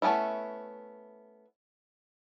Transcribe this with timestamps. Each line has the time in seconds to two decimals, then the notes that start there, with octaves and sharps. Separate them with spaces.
0.02 A3 B3 C#4 E4